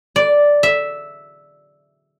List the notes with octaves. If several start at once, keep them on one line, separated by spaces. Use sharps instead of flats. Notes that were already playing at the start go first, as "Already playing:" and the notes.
D5
E5